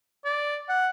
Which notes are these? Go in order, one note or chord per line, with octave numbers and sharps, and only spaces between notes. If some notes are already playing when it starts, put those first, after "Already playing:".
D5
F#5